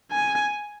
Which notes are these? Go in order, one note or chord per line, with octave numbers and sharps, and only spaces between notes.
G#5